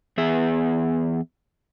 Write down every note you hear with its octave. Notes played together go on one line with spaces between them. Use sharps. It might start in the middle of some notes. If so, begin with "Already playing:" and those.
E2 B3 G#4 E5